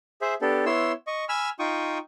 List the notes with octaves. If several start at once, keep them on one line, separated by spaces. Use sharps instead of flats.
G#4 C5 E5
B3 D4 G4 A4
B3 E4 C#5 C6 E6
D#5 C#6
G#5 B5 E6 F6
D#4 F4 G5 C#6 D#6